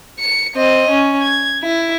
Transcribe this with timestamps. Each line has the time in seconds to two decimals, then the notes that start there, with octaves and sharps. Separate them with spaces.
0.19 C#7
0.56 C4 D#5
0.90 C#4
1.22 G#6
1.63 E4